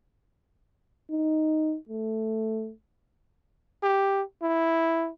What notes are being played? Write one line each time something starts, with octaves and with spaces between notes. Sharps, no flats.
D#4
A3
G4
E4